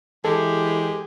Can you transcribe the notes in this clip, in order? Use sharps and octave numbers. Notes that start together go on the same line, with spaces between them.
E3 G#3 G4 A4